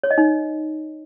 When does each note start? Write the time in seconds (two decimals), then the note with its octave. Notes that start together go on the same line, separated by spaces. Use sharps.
0.04 C#5
0.11 D#5
0.18 D#4